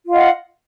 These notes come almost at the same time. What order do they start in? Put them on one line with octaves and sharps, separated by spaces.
F4 F5 D#5 F#5